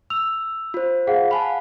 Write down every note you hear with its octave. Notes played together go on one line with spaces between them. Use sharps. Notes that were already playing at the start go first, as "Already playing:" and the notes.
E6 F7
F4 C5
G#4 F5 F#5
F5 F#5 G#5 A5 B5